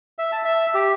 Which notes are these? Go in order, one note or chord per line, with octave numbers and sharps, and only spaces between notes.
E5
A5
E5
G4